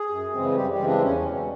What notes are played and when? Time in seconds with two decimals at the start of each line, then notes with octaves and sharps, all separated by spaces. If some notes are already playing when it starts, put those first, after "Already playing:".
Already playing: G#4
0.10 F#2
0.33 C#3 E3 G#3 C4
0.56 F#2 G3 G4
0.71 G3 G4
0.79 C#3 E3 G#3 C4
0.87 D4
1.02 E2 C#4
1.25 B2 G3